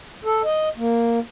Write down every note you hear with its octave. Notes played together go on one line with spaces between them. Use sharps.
A4
D#5
A#3